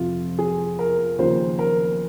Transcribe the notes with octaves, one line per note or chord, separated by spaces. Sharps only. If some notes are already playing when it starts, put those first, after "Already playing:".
Already playing: F2 C3 F3 F4
G#4
A#4
D#2 C#3 F3 C5
A#4